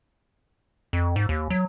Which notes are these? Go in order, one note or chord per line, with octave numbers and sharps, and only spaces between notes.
F2
G#2
D#2
F#3